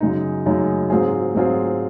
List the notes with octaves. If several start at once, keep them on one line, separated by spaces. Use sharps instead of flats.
F#2 C#3 G#3 D#4
F#2 C#3 G#3 D#4
G#2 F#3 C4 F4 G#4
G#2 F#3 C4 F4 G#4